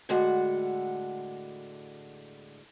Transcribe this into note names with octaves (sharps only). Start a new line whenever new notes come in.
A2 D3 G#3 F#4 F#5